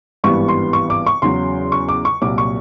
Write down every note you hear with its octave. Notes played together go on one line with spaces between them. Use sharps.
G#1 G2 E3 G3 B3 C#6
C6
C#6
D6
C#6
E2 C#3 F#3 C6
C#6
D6
C#6
C2 A#2 F#3 D6
C#6